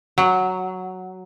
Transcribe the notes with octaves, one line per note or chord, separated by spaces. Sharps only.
F#3